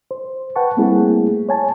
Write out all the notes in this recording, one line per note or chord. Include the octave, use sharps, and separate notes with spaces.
C5
B4 F#5 G5 A5 C#6
G3 A3 A#3 C4 E4 G#4
C#5 G#5 A5